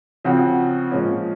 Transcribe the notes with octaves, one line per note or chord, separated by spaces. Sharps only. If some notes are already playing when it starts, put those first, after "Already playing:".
C#3 F3 C4 F#4
A#2 F3 G#3 C#4